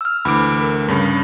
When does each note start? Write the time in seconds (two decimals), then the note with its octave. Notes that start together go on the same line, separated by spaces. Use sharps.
0.01 E6 F6
0.25 D2 E3 B5 D6 D7
0.61 A#4
0.88 G2 C#3 C#4